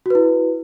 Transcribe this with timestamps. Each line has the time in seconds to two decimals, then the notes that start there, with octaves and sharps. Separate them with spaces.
0.06 F#4
0.10 B4
0.15 E4